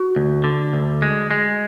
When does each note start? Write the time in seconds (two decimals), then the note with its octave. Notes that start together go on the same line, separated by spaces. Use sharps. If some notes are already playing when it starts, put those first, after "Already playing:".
Already playing: F#4
0.16 D2
0.44 D3
0.73 D2
1.02 G#3
1.31 G#3